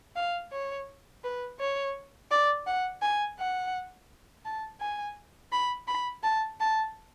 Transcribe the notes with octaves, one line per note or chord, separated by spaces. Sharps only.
F5
C#5
B4
C#5
D5
F#5
G#5
F#5
A5
G#5
B5
B5
A5
A5